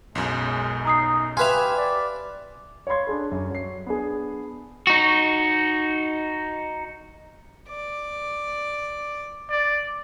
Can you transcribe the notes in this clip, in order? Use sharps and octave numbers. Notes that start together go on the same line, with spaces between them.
B1 F#2 G#3
D#4 A#5 D#6 C7
G4 B4 E5 F5 G#5 C6 F7
D5
C#5 F5 B5 C6 G#6
D4 G#4 A4
F#2
F#3 C7
B3 D4 G#4
D#4 F#4
D5
D5